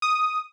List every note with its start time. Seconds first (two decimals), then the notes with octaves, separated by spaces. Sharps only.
0.02 D#6